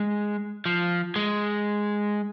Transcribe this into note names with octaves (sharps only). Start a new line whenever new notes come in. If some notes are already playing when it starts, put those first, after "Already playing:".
Already playing: G#3
F3
G#3